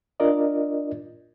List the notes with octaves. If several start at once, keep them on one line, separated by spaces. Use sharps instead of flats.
D4 F4 A#4 D5 D#5